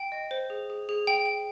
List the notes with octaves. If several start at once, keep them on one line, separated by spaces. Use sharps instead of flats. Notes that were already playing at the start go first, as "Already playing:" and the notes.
Already playing: G5
D#5
C5
G#4
G#4
G#4
G5
G5